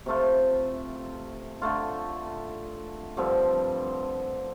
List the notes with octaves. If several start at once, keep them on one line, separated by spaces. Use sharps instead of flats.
C3 A3 F4
D3 A3 F4
G2 D3 F3 C4